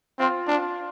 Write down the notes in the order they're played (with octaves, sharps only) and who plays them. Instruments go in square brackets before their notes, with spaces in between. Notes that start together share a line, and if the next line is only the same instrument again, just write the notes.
[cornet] C4 [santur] F4
[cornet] D4 [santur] F4